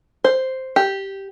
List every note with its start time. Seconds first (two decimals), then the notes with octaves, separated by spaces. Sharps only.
0.24 C5
0.76 G4